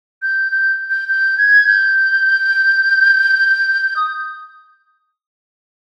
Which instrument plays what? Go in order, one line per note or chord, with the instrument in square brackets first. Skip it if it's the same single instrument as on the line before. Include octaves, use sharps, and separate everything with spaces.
[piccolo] G6
G6
G6
G6
G#6
G6
D#6